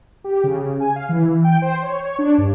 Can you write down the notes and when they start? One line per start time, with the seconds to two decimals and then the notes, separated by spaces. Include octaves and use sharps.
0.24 G4
0.44 C#3
0.80 G#5
0.96 F5
1.09 E3
1.44 G5
1.62 C5
1.83 C#5
2.05 C#5
2.19 D4
2.38 G2